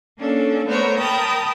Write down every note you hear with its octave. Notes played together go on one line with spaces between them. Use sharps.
A#3 C#4 D4 A4
A3 B3 A#4 C5 C#5
A#4 G5 A5 B5 D#6